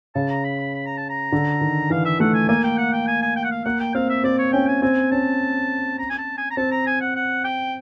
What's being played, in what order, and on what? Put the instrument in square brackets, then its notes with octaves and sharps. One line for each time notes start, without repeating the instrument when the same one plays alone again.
[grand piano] C#3 [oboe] A5
[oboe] A#5
B5
B5
B5
A#5
A5
A#5
[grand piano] D3
D#3
[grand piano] E3 [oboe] F5
[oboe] E5
[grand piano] A3 [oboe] F#5
[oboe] G#5
[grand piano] A#3 [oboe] G#5
[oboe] G5
F#5
G5
G#5
G#5
G5
F#5
F5
[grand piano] A#3 [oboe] F#5
[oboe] G5
[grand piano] C4 [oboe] F5
[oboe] E5
[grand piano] C4 [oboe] D5
[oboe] C#5
[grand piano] C#4 [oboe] G5
[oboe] G#5
[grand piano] C4 [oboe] G#5
[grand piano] C#4 [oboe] A5
[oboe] A#5
G#5
A5
G#5
A#5
[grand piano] C4 [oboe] A5
[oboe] A#5
G#5
F#5
F#5
G5